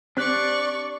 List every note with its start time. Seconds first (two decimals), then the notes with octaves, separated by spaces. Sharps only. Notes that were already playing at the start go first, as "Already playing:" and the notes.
0.17 C4 D4 G4 D5 C#6 F#6